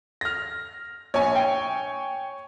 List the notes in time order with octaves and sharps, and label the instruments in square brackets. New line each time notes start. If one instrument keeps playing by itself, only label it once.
[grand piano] F6 A#6
[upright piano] A#1 [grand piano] C#5 G#5
[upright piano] G5